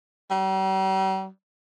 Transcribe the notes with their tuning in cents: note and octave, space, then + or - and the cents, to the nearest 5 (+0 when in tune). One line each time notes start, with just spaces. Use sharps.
G3 -45